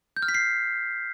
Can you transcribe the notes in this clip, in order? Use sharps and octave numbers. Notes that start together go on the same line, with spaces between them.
G6
F6
B6
C7